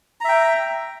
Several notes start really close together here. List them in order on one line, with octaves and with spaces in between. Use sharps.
A#5 E5 G5